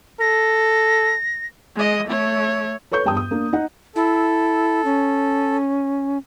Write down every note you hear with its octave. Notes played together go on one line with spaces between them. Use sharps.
A4 A#6
G#3 D#5
A3 C#5
A4 B4 C#5 C#6 G6
E2 G2 G5 A5 D#6
D#6
A#3 D4
D#4 F#5
E4 A4
C#4